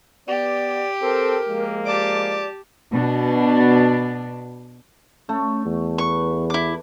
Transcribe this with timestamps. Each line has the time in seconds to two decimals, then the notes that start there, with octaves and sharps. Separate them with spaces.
0.28 B3 G4 D5
1.02 C4 A4 A#4
1.48 F3 G#3 A#3
1.85 G4 D5 A5 D6
2.93 B2 D4
5.29 A3 C#4
5.66 E2
5.98 B4 C#6
6.50 E4 D6